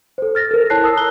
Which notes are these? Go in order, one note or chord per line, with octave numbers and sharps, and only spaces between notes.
A4 C5
F6 A6 A#6
A4 A#4
E4 A4 C#5 A5 F#6 C7
A5 D#6 E6
A#5 F#6 G7